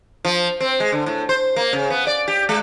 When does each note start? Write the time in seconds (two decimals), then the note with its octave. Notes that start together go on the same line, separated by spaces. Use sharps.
0.25 F3
0.60 C4
0.80 G#3
0.92 D3
1.06 A2
1.29 C5
1.56 A#3
1.73 C#3
1.90 B3
2.07 D5
2.28 G4
2.49 G#3